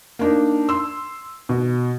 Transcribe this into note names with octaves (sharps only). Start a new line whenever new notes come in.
A#3 D4 D#4
C6 E6
B2